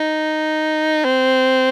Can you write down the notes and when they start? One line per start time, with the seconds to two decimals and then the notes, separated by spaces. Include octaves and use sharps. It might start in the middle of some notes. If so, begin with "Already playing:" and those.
Already playing: D#4
1.04 C4